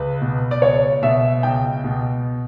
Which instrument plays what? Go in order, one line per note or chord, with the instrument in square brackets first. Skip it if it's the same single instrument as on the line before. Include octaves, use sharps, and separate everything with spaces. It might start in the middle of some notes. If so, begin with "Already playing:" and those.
Already playing: [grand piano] C#2 B4
B2
D5
C#2 C#5
B2 E5
C#2 G5
B2